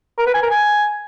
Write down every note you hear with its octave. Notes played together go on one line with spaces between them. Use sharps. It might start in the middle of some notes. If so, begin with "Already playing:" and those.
A#4
B4
G#5
A#4
G#5